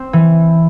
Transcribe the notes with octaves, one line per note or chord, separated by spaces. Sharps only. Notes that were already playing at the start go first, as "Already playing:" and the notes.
Already playing: C4
E3